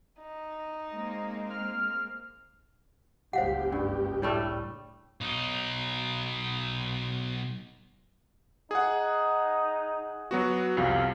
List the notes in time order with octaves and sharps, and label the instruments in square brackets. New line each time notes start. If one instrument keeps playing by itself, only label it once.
[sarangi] D#4
[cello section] G#3 A#3 C4
[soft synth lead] F6
[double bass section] F#1 C#2 [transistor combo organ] G4 [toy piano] C5 F5 F#5
[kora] G2
A2 G3 A3
[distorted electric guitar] B1 D#4
[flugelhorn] D#4 [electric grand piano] G#4 F#5
[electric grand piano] F#3 B3 F#4
[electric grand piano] C2 F2 C3 [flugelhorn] F5